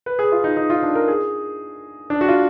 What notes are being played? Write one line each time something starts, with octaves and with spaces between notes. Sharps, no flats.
B4
G#4
F4
D#4
D#4
F4
D4
A#4
G#4
D4
F#4
F4